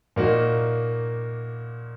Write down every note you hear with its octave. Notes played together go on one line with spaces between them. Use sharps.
A#2 A#3 D#4 F#4